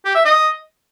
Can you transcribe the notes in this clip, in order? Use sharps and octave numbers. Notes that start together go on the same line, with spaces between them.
G4
E5
D#5